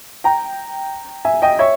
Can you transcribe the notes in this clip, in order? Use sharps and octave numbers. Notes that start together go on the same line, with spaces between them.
G5 A#5
E5 G#5
D#5 G5
C#5 E5